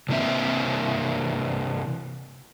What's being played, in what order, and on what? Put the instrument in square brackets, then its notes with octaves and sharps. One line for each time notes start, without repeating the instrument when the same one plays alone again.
[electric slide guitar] C3 E3 A#3 C4 E5